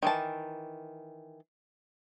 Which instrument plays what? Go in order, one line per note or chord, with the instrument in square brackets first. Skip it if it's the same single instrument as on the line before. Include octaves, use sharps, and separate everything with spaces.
[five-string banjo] D#3 E3 A5